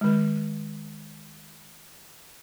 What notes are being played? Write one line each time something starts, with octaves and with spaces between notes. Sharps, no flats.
D#3 G#3